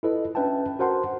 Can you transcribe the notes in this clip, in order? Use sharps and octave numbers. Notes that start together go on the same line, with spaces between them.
E4 F4 A4 B4 D#5
C#4 D4 B4 E5 G5 A5
F#4 A#4 C5 F#5 A5 C6